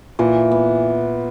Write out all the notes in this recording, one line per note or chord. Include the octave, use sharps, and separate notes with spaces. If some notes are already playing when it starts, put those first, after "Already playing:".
A#2 E3
B3